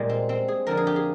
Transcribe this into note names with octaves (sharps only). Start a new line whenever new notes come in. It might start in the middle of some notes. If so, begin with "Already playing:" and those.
Already playing: A#2 G3 G#3
C4
C4
G#4
F2 D3 F3 A#4
G#4
G4
G#4